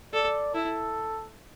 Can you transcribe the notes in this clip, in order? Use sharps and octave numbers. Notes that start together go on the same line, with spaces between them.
A4 D5
E4 A4